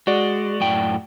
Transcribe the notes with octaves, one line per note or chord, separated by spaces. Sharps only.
G#3 F#4 D5
F#2 A2 G5